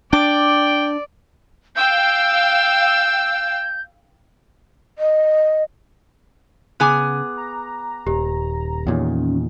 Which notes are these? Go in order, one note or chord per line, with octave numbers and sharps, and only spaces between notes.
D4 D5 G5 D6
F5 G5 E6 G6
D#5
C#3 B3 G#4 G#5 D6 F#6
A#5
D#1 G4
E2 A#2 D#3 C#4